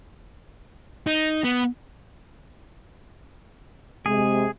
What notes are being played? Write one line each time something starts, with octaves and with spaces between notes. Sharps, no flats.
D#4
B3
C3 G#3 G#4